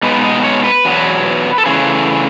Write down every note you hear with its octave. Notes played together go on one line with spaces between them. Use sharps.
B2 G#3 B3 D#4 B4
D#5
C#5
B4
E2 B2 F#3 B3
A4
C#3 E3 A3 G#4